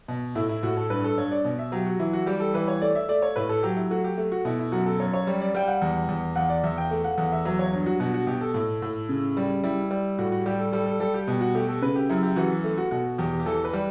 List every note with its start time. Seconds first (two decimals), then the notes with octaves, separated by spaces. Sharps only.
0.08 B2
0.35 A2 E4
0.49 E4
0.63 A2 F#4
0.77 A4
0.90 G2 B4
1.04 A4
1.17 G2 C#5
1.31 D5
1.45 B2
1.59 E5
1.72 F#3 G4
1.86 F#4
1.99 E3 E4
2.13 F#4
2.26 G3 G4
2.40 A4
2.54 E3 B4
2.68 C#5
2.82 A3 D5
2.95 E5
3.09 A3 D5
3.22 C#5
3.36 A2 B4
3.49 A4
3.63 F#3 G4
3.77 E4
3.90 A3 F#4
4.04 G4
4.18 A3
4.32 F#4
4.45 B2 E4
4.59 E4
4.72 F#2 F#4
4.86 A4
5.00 F#2 C#5
5.14 C#5
5.27 G3
5.41 D5
5.55 G3 G5
5.68 F#5
5.82 E2
6.09 E2
6.36 E2 F#5
6.49 D5
6.64 E2 E5
6.78 G5
6.91 A3
7.04 F#5
7.18 E2 F#5
7.32 E5
7.45 F#3 E5
7.59 C#5
7.73 G2
7.86 F#4
8.00 B2 F#4
8.14 F#4
8.27 B2 G4
8.41 A4
8.54 A2
8.82 A2
9.09 C#3
9.37 G3
9.63 G3 E4
9.91 G3
10.18 A2 F#4
10.32 F#4
10.46 G3 G4
10.59 A4
10.72 G3 A4
10.86 A4
11.00 G3 A4
11.14 G4
11.28 B2
11.41 F#4
11.55 A3 G4
11.68 A4
11.82 C#3 B4
11.96 G4
12.09 F#2 E4
12.23 G4
12.36 E3 F#4
12.64 A3
12.78 F#4
12.91 B2 F#4
13.18 E2 G4
13.40 G4
13.46 E3 A4
13.64 B4
13.73 G3